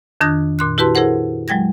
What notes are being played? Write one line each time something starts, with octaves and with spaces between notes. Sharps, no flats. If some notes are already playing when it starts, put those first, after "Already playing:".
F2 D#3 D4 D#6 F#6 A#6
A#2 C6 F#6
E4 F#4 G4 B4 A5 C6
E4 G#4 A#4 C5 F#5
F#3 G#3 G5 G#6 A#6